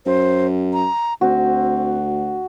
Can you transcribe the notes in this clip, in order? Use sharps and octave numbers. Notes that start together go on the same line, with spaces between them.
F#2 C5
A#5
D2 C4 F#4